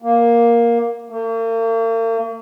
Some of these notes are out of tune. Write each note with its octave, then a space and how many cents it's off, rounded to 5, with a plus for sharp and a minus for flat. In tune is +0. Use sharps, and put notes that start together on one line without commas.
A#3 +5
A#3 -45